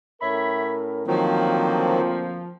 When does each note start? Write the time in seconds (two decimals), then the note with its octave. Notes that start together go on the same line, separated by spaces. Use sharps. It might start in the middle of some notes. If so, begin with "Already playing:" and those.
0.22 A2 C#4 A#4 C#5 E5 B5
1.07 D2 D#3 F3 F#3 A#3 C4